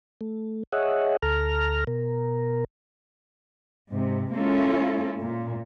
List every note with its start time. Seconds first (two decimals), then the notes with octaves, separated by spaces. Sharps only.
0.21 A3
0.73 G#4 C#5 D#5 E5 F#5
1.22 D2 A4 A#5 F6
1.87 B2 A#4
3.91 G#2 C3
4.34 G#3 A#3 C#4 E4 F4 A4
5.19 A#2